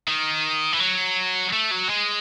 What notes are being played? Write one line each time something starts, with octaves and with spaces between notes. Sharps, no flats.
D#3
E3
F#3
A3
F#3
G#3